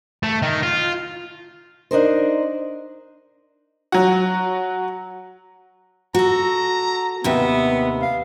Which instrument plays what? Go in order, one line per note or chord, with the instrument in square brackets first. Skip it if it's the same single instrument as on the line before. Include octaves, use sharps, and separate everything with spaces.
[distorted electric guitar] A3
D#3
F4
[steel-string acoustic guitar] D4 D#4 A#4 C5
[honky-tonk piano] F#3 F#4
[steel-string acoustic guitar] F#4 A4 [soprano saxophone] A#5
[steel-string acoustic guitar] D#2 C3 E5 [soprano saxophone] B3
[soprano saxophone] F5